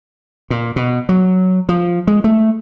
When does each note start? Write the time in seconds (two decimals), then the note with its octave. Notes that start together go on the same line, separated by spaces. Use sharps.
0.50 A#2
0.76 B2
1.09 F#3
1.69 F3
2.07 G#3
2.24 A3